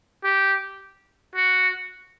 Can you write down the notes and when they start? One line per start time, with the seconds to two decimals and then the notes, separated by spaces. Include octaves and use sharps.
0.24 G4
1.35 F#4